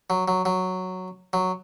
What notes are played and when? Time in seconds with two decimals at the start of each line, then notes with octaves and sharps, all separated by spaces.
0.10 F#3
0.28 F#3
0.45 F#3
1.33 F#3